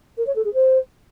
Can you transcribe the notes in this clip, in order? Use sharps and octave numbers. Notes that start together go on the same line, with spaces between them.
A#4
C#5
A4
G#4
C5